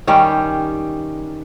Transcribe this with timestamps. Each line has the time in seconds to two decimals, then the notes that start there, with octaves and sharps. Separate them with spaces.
0.07 D#3 G3 C#4 G4